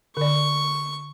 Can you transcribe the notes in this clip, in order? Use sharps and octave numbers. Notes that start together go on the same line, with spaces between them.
D3 D5 C#6